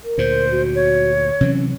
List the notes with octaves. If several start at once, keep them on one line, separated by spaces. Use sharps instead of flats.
A#4
D2 A#2 C5
F#4
C#5
C3 E3 F#3 C#4